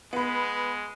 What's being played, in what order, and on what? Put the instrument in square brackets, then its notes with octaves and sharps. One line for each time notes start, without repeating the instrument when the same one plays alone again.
[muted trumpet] G#3 [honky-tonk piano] B3 B4